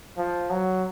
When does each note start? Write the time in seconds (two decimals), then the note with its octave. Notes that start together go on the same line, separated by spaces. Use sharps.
0.18 F3
0.50 F#3